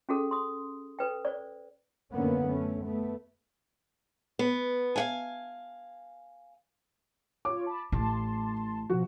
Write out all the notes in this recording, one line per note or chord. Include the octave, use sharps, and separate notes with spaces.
C#4 F#4 G#4 A4
C6 D#6
A4 B4 G5
C5 D5
F#2 D3 A#3 B3 C#4
A3 C#4
A3 B3
B3
F5 F#5 G#5
F4 C#5 D6
A5 B5
A1 A2 A5 C6
B2 F3 F#4